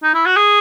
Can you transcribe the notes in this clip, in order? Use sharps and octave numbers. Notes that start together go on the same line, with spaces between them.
D#4
E4
F#4
G#4